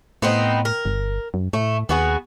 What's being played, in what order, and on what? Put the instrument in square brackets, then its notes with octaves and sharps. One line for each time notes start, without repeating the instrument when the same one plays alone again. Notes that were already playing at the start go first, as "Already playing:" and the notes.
[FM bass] A2 [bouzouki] B3 C4 D#4
[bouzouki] A#4
[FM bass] G1
F#2
[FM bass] A2 [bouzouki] A3
[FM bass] D#2 [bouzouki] B3 F#4 G#4